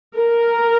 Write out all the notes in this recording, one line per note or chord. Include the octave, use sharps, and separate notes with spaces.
A#4